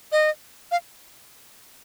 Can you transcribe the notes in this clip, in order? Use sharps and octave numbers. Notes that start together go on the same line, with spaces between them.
D#5
F5